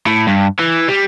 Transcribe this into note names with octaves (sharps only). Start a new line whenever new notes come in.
A2
G2
E3
G3